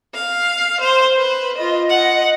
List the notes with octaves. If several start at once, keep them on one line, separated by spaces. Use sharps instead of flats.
F5
C5
B4
F4 D#5
D#5 F#5